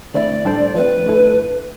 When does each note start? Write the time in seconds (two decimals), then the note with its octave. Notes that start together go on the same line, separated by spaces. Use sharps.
0.14 D3 A3 C4 E4 D5
0.45 A2 G3 D4 A4 C5
0.75 F3 A3 C4 B4
1.06 G2 D3 A3 E4 A4